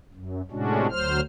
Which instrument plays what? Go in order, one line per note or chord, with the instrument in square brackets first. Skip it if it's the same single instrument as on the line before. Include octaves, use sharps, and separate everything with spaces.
[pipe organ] F#2
A2 C3 G#3 C#4 D4 F#4
D2 F#3 C5 F6